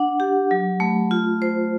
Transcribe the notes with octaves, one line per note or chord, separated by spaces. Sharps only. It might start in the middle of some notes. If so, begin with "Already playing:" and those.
Already playing: D4 F#5
G4
F#3
A3
F4
C5